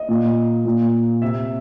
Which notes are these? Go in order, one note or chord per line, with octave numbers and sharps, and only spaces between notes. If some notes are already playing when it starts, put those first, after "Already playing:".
Already playing: D#5
A#2
A#2
C3 E5